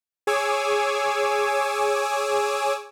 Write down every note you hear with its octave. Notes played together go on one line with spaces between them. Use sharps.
G#4 C#5 G#5 D6 E6